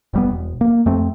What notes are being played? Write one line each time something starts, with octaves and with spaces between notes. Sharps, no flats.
F1 G3 B3
E1
A#3
F2 A3 C4